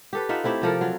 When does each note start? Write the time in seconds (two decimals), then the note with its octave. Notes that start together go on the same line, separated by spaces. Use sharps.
0.13 G4 A4 B4
0.29 D#4 F4 E5 F#5
0.44 A3 C4 E4 G4
0.62 C3 F3 A4 A#4
0.81 F#3 F4